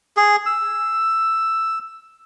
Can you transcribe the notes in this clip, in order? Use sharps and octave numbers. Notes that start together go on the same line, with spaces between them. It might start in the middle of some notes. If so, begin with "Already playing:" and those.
G#4
E6